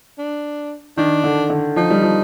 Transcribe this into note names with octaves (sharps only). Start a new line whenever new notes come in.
D4
D#3 D4
D3
D3
F3 D#4
G3
F3